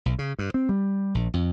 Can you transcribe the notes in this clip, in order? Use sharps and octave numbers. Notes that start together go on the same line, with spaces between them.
B1
C#3
G2
C4
G3
A#1
F2